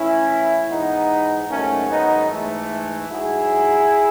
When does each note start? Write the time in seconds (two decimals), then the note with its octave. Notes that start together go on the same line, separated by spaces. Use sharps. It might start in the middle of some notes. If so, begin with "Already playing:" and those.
Already playing: A2 E3 C#4 E4
0.69 G#2 E3 B3 D#4
1.48 G#2 D#3 F#3 A3 C#4
1.88 B3 D#4
2.29 G#2 E3 A3
3.08 G#2 F#3 E4 G#4